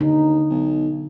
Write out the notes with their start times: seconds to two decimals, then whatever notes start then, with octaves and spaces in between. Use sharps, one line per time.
0.01 D#2 D3 D#4
0.50 B1